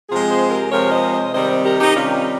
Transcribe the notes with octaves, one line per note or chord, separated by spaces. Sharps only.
C3 F3 G#3 F4 G#4
G#4 C5
G4 A#4
C3 F3 G#3 A#4 C#5
C5 D#5
C5 D#5
C3 D#3 G3 C5 D#5
G4 A#4
D#4 G4
C3 D#3 G3 C#4 F4